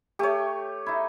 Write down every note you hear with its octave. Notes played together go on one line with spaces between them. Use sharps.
A3 G4 C#5
D#4 E4